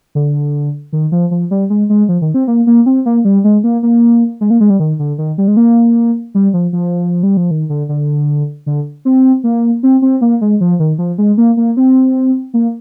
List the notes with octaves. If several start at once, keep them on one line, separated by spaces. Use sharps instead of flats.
D3
D#3
F3
F3
G3
G#3
G#3
F3
D#3
C4
A#3
A#3
C4
A#3
G3
G#3
A#3
A#3
G#3
A#3
G#3
G3
D#3
D3
D#3
G3
G#3
A#3
G3
F3
F3
G3
F3
D#3
D3
D3
D3
C4
A#3
C4
C4
A#3
G#3
F3
D#3
F3
G#3
A#3
A#3
C4
A#3